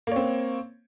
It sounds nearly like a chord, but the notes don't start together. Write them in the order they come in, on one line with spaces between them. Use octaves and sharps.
A#3 C#5 C4